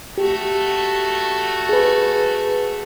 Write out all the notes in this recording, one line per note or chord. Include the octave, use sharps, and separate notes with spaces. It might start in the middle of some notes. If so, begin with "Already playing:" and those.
A3 F#4 G4
G#4 B4